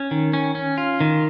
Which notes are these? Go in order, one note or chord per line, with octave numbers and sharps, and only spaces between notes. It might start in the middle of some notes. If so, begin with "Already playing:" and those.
Already playing: C#4
D#3
C#4
C#4
F4
D#3